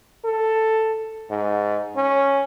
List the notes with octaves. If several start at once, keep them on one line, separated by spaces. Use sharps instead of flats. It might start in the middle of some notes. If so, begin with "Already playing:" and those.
A4
G#2
C#4